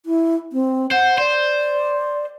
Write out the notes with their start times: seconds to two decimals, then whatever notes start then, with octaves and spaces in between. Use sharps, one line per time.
0.06 E4
0.53 C4
0.91 C5 F#5
1.18 C5 D5